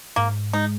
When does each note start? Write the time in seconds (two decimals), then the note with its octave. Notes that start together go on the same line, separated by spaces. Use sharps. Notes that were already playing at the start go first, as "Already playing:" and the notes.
0.16 G#2 A#3
0.53 G#3 D#4